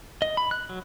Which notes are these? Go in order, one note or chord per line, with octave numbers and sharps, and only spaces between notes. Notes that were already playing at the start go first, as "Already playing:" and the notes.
D#5
B5
F#6
F#3